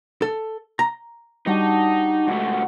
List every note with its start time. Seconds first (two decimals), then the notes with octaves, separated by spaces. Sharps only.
0.22 A4
0.79 A#5
1.47 G3 D4 D#4 F#4 G4
2.28 C2 G#3 A3 F#4